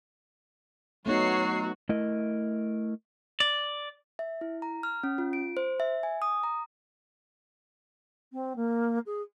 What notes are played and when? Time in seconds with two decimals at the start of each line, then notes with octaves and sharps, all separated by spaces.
1.06 F#3 A3 B3 D#4 F#4 C#5 C7
1.89 A3 E4 A#4 D#5
3.40 D5
4.19 E5
4.41 E4
4.62 A#5
4.83 F6
5.03 C#4
5.18 F4
5.33 D7
5.57 C5
5.80 E5
6.03 G#5
6.22 D#6
6.43 A#5
8.33 C4
8.56 A#3
9.06 G#4